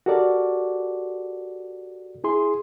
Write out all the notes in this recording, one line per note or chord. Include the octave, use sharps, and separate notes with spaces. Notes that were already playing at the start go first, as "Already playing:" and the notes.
F#4 G4 A4 A#4 D5
E4 G#4 C6